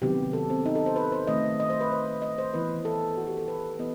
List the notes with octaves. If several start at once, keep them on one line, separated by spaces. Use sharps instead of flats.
C3 D#3 F#3 B3 G4
A4
C4
D#4
A4
C5
B4
C5
D#3 A3 C4 D#5
D#5
C5
B4
C5
D#5
C5
E3 B3 B4
A4
F#4
G4
A4
B4
E3 B3 D#5